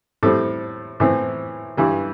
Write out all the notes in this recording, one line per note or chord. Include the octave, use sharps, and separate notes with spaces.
A2 G3 C4 A4
A2 E3 C4
G2 E3 G3